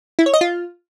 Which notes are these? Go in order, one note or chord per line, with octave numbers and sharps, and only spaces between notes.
E4
C#5
D#5
F4